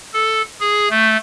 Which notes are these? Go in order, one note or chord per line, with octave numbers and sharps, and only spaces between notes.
A4
G#4
A3